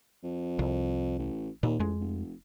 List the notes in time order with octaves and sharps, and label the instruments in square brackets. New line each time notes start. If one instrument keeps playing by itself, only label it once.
[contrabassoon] F2
[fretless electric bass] C2
[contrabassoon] A1
[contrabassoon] D#2 [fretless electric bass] A#2
[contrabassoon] A1 [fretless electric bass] F2 G#3
[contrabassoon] F1